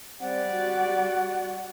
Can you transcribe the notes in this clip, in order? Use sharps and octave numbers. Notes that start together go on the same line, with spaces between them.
G3 C4 D5 F#5
F#4